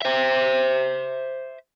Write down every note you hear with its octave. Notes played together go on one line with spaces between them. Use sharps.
C5 E5